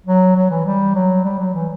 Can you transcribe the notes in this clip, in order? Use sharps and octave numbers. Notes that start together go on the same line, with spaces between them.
F#3
F#3
E3
G3
F#3
G3
F#3
E3